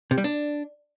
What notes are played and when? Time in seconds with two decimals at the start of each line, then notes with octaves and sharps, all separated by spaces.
0.11 C3
0.18 G3
0.24 D4